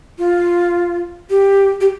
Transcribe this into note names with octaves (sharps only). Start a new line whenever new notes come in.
F4
G4
G4